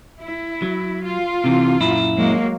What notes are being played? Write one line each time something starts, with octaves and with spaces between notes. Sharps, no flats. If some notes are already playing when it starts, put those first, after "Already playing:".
E4
F#3
F4
C3 E3
F#2 A#2 E4
F#3 G#3 A#3